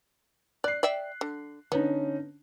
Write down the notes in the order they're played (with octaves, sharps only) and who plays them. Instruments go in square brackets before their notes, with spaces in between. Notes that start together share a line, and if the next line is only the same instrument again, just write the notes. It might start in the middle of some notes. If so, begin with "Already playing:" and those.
[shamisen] D5 [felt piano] F#6 C7
[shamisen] D5 E5 G5
D3
[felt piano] D3 C#4 D#4 [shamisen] B3